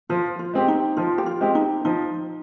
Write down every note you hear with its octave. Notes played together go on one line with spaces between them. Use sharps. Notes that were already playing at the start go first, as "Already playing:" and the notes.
F3 F4
F4
G#3 C4 G4
D#4
F3 F4
G4
F4
G#3 C4 G4
D#4
F3 D#4